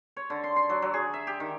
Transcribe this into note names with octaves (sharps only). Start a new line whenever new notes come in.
C#5
D3
C6
C6
F#3
F#3
G#4
E5
G4
D#3